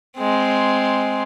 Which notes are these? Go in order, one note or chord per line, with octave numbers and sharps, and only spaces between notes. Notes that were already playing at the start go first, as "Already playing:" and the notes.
G#3 C4